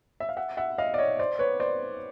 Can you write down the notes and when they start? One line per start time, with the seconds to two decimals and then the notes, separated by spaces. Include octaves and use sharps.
0.20 E5
0.29 F5
0.37 E5 F#5
0.57 E5 F#5
0.78 D#5 F5
0.94 D5
0.98 C#5 D#5
1.19 C5 D5
1.39 B4 C#5
1.60 C5 D5